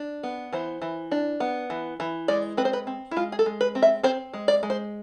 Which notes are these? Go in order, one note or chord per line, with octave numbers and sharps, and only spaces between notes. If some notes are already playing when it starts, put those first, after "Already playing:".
Already playing: D4
B3
E3 C5
E3
D4
B3
E3
E3
G#3 D5
C4 B4
C5
B4
C4
E4
G#3 F4
G#4
A4
G#3
B4
C4
E5
C4 C5
G#3
D5
G#3
C5